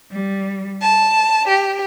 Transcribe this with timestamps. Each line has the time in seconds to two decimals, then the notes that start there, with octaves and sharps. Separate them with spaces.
0.12 G3
0.82 A5
1.48 G4